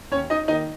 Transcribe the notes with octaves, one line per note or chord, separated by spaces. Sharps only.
D#2 C#4 C#5
D#4 D#5
D#3 A#3 D#4 D#5